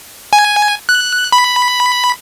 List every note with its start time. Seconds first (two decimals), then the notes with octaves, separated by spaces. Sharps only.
0.33 G#5
0.89 F#6
1.32 B5